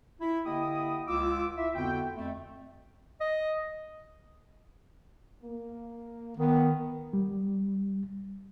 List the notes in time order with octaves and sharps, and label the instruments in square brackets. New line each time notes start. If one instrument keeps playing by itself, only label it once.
[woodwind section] E4
D3 A#3 E4 G4 D#5 D#6
C#2 F4 D6 E6
E4 F4 E5
F2 D3 B3 C4 F#4 G5
F2 A3
[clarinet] D#5
[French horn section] A#3
[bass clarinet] D#3 [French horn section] B3
[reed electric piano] G3